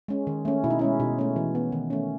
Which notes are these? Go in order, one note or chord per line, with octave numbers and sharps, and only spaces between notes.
G#3 C#4
D#3
A3 C#4
B2 E4
D#4
G#3 C#4 E4
B2 D#4
A3 C#4
E3
B3
D#3
A3 C#4